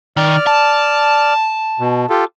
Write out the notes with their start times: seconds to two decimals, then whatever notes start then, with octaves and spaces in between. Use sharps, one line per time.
0.17 D#3 D5 F6
0.47 A5
1.80 B2
2.10 F4 G4 A4